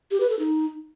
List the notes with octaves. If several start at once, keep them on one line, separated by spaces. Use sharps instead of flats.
G4
B4
A4
D#4